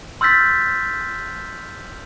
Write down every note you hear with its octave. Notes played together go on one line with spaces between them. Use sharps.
C6 E6 F6 G6 A6 B6